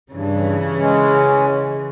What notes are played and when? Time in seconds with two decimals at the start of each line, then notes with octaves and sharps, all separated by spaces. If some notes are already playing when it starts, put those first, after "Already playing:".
0.13 G2 C#3 E3
0.80 G#3 C#4